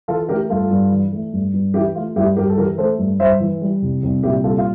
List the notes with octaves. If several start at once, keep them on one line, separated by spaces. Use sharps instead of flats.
E3 F4 A4
A3 G4 A#4
G2 F4 A4
G2
E3
A3
G2
G2
E3 E4 G4
A3 F4
G2 E4 G4
G2 G4 A#4
A4
E3 G4 A#4
A3 A4 C5
G2
G2 C5 E5
E3
G3
C2
C2
A#2 E4 G4
G3 F4 A4
F4